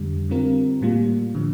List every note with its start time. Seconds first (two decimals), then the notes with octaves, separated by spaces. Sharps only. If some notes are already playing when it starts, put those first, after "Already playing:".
Already playing: F2 D3 G3
0.29 D3 G3 C4 F4 A#4
0.81 A2 G3 A#3 F4
1.35 D3 F3